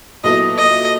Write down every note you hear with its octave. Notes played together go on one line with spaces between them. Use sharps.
A#2 F#3 B3 E4 A4 D#5
D#5